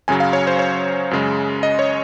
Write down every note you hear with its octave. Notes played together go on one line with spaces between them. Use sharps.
F#2 C#3 F#3 G#5
F5
C#5
C5
C#5
F#2 C#3 G#3
D#5
C#5